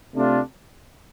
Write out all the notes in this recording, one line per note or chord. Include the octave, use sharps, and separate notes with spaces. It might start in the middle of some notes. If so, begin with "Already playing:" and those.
C3 A3 D4 F4